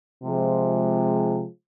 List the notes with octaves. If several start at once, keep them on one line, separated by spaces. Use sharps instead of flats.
C3 F3 G#3